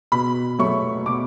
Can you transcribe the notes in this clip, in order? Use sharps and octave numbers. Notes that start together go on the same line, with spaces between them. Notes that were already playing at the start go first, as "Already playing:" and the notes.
B2 B5
F#3 A3 C#6
B2 D6